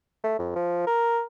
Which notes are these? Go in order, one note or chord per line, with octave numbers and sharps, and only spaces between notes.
A3
F2
F3
A#4